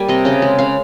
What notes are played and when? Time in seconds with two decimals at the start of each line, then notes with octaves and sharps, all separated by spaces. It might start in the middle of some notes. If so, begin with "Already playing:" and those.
Already playing: G3 A#3 G#5
0.08 C3 D#5
0.25 C#3 D#5
0.42 G#3
0.59 C#3 F5